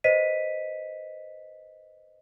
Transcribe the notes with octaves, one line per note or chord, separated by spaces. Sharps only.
B4 C5 D#5 B6 D#7